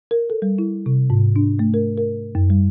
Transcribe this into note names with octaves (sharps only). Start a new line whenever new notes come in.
A#4
A4
G3
E4
C3
G#2
D4
A3
A#4
A#4
F#2
G3